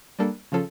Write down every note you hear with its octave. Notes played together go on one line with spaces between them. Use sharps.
G3 A#3 D4 A4
C#3 F3 C#4 F4 A4